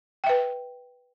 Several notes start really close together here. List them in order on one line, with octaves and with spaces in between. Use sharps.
G5 E5 B4